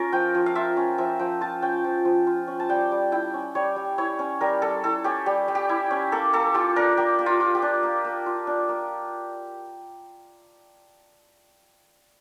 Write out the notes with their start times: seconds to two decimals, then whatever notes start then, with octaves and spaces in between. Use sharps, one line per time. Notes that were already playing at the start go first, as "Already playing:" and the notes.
Already playing: C#4 F4 A#4
0.12 F3 G5
0.35 F3
0.46 F5
0.55 F4 E5
0.77 C#4
0.98 F3 E5
1.19 F3 G5
1.41 F4 A5
1.62 C#4 G5
1.84 F3
2.05 F3
2.27 F4
2.48 C#4
2.60 A5
2.69 G3 G5
2.91 G3
3.12 E4 G5
3.34 C#4
3.55 G3 C#5
3.76 G3
3.98 E4 C#5
4.19 C#4
4.41 G3 A#4
4.62 G3 A4
4.84 E4 A4
5.04 C#4 G4
5.26 G3 G4
5.48 G3
5.55 G4
5.69 E4
5.91 C#4
6.12 A#3 A4
6.33 A#3 A4
6.54 F4 G4
6.76 D4 A#4
6.97 A#3 G4
7.19 A#3
7.26 F4
7.40 F4
7.55 G4
7.62 D4
7.83 A#3
8.05 A#3
8.26 F4
8.47 D4
8.69 A#3